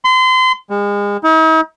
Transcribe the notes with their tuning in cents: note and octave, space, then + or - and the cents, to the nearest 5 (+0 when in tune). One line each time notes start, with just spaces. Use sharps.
C6 -35
G#3 -35
D#4 +45